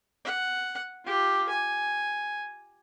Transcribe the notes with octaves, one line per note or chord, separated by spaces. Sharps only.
F#5
F4 G4
G#5